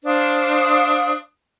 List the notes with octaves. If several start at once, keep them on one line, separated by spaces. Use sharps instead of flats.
D4 C5 F5 D#6